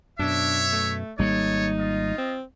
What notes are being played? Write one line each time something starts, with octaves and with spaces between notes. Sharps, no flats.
F#2 B2 D4 C#5 E5
A3
G#1 G3 A#3 D#4 A4 C#5
F4 D#5
C4